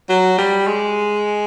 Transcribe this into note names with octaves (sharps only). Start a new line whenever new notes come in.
F#3
G3
G#3